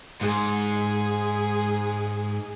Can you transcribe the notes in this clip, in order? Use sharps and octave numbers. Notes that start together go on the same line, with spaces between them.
G#2 G#4